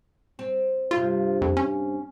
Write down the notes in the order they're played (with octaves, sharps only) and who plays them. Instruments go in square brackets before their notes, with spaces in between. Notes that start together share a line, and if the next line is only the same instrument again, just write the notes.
[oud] C4
[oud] G2 C3 [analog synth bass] F4
[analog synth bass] F2
C#4